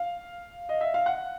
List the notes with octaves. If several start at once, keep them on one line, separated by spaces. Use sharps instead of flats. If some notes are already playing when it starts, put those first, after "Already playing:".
Already playing: F5
D#5
E5
F5
F#5